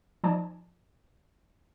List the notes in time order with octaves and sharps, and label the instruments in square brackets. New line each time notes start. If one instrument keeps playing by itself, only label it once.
[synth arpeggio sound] F3 D#4 D5 G#5 A5